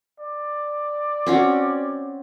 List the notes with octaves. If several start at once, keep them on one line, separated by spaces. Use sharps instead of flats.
D5
C4 C#4 F#4